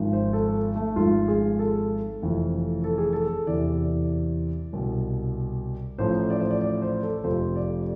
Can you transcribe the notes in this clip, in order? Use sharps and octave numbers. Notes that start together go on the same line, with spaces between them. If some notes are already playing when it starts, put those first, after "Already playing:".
Already playing: G#1 G#2 F3
C5
A4
A3
G#1 G#2 F3 F4
G#4
A4
F1 F2 E3
A4
G#4
A4
E2 C3 E3 D5
C2 B2
A1 A2 F3 C5
D5
C5
D5
D5
C5
A4
F1 F2 C3 F3 C5
D5